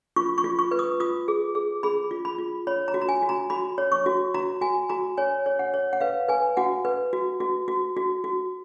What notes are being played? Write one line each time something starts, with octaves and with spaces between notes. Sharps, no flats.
F4 C#6
C#6
F4
C#6
B4
D#6
F4 D#6
G#4
G#4
G#4 B5
F4
B5
F4
C#5 B5
A#5
F#4
A#5
G#5
F#4
A#5
F#4 B5
C#5
C#6
F#4
F#4 A#5
F#4 G#5
F#4 A#5
C#5 G#5
C#5
F#5
C#5
F#5
B4 F5
B4 G#5
F#4 F#5
B4
F#4
F#4
F#4
F#4
F#4